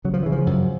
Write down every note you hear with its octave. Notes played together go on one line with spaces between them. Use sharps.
C#3 F#3
F3
C#3 E3
F3
F#2